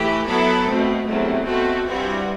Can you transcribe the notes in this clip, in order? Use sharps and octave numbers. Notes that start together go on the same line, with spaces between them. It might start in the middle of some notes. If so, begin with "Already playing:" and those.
Already playing: E3 A3 G4
F#3 B3 E4 A4
B2 A3 C4
E2 C3 F#3 A3
B2 A3 C4 F#4 A4
G2 E3 G3 C4 F#4